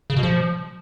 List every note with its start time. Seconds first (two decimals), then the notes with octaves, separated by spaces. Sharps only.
0.10 C#3
0.16 B2
0.23 F3